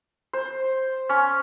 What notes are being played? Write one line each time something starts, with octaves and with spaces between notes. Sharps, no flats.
C5
C#4